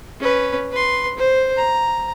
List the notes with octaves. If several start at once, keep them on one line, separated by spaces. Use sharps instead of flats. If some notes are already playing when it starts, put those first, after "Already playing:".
C#4 B4
B4 C6
C5
A#5